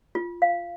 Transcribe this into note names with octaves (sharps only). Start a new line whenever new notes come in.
F4
F5